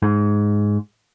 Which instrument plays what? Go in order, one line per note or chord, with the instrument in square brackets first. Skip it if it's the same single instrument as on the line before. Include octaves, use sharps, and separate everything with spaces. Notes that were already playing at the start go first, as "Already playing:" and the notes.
[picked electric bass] G#2